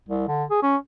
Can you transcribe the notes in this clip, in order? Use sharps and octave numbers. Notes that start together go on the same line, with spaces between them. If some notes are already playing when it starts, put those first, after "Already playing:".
C2
D3
G#4
C#4